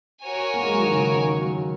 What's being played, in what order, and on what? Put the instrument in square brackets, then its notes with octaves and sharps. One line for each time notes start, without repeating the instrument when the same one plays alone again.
[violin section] F#4 A#4 C#5 G#5
[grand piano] A#3
G#3
F#3
D#3
C#3
D#3
F#3